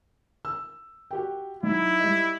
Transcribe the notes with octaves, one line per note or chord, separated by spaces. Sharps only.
E6
F#4 G4 G5
F#3 D#4 E4
G3 D#5